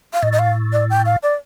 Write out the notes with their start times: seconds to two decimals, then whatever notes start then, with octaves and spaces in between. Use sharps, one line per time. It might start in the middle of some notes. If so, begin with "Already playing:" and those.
0.13 F5
0.23 A2 D#5
0.33 D#5
0.39 F5
0.73 D5
0.90 G5
1.05 F5
1.23 D5